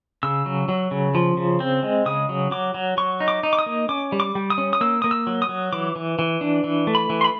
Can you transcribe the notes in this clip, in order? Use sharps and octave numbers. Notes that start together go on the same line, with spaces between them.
C#3 E6
F#3
F#3
C#3
F3
C#3
C4
G#3
C#3 D#6
F#3
F#3 D6
F#3
F#3 C#6
D#4
D6
D#4
D6
D#6
A#3
C#4 D6
G3
D6
G3
D#6
C#4
D#6
A#3 E6
A#3 D#6
E6
F#3
D#6
F#3
E3 D6
E3
E3
D4
E3
A3
B5
E3
C6
B5